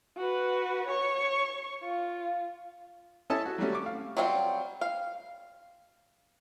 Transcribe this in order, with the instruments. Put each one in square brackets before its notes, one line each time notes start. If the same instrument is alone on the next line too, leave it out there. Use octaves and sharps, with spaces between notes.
[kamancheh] F#4 B4
C#5 C#6
F4
[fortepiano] C#4 E4 A4 D#5 G#5 A5
F#4
F#3 G3 A3 C#4
C#6 D6
F5
[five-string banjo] F#3 G3 C4 E4 F4
F5